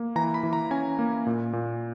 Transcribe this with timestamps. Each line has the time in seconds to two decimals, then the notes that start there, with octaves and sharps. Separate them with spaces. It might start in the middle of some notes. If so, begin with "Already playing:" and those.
Already playing: A#3
0.16 E3 A#5
0.34 B5
0.43 E3
0.53 A#5
0.71 C#4 G#5
0.99 A#3
1.26 A#2
1.53 A#2